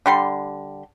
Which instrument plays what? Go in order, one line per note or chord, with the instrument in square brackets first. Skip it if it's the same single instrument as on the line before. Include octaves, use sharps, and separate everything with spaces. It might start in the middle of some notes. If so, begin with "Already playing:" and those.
[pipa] D3 G3 C6